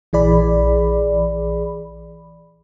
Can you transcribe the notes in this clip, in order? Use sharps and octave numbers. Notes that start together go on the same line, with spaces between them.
A#1 E3 G#4 D5 B5